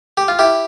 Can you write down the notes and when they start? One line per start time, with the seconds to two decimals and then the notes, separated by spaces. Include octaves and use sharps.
0.17 G4
0.28 F4
0.39 E4 G4